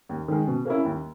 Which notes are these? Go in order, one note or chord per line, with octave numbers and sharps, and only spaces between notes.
D#2
D#3 G#3
B2
A#3 C#4 E4
D#2